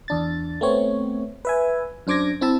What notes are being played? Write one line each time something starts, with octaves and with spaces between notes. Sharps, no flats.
E2 D4 A6
A3 B3 C4 C#5
B4 E5 G#5
F#2 D4 C5 D6 G#6 A#6
C4 E4 E5 A5